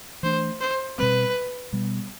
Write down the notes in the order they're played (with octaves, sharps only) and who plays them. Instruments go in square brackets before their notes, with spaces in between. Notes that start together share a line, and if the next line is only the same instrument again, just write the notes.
[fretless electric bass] E3 A3 D4 [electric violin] C5
[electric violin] C5
[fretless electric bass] B2 G3 C4 [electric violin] B4
[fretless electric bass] B2 G3 B3